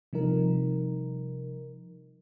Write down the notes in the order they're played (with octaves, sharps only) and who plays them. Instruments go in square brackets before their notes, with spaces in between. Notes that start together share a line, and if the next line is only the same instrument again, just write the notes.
[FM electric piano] C3 F3 G3 D#4 A#4